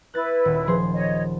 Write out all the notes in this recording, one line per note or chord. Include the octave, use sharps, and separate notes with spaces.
E4 B4 F#6 A6
D#1
F3 G#4 C6
C#5 D#5